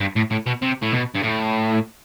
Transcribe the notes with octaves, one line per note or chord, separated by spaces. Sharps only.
G2
A2
A2
B2
C3
A2
B2
G2
A2